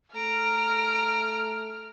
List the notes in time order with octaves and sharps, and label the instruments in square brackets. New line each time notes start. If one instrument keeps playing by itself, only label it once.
[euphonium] A3 [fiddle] A#5 [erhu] F6 [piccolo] D7